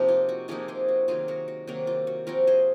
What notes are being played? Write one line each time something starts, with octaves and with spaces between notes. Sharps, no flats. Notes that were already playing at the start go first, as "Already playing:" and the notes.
Already playing: C3 F3 A#3 D#4
F4
F#4
C3 F3 A#3 D#4 F4 G#4
G#4 C5
F#4
C3 D#3 F#3 A#3 F4 G#4
F#4 A#4
F#4
C3 D#3 F#3 A#3 F#4
F4
F#4
F3 C4 F4 F#4 A#4
G#4 C5